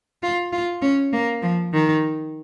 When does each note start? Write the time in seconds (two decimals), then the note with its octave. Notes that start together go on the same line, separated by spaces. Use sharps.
0.23 F4
0.52 F4
0.82 C#4
1.13 A#3
1.42 F3
1.73 D#3